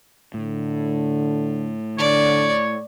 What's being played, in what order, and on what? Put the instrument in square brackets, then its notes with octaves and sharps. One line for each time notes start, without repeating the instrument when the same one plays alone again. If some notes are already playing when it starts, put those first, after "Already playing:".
[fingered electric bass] A2 [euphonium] D3
[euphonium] D3 [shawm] C#5 [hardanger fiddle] D5